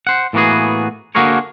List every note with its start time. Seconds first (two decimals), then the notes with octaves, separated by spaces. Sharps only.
0.07 C5 F#5
0.33 A2 E3 A#3 B3 F#4 G#4
1.15 D3 A#3 F#4 G#4 A#4 C#5